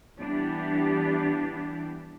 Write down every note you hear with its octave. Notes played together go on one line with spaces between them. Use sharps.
E3 G3 B3 D4 G4